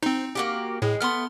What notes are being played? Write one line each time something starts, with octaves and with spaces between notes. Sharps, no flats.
C4 D#4 C5
A#3 F#4 G4
A2 G#3
A3 B3 C6 F6